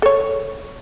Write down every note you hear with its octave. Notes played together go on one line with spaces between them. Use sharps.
A4 C#5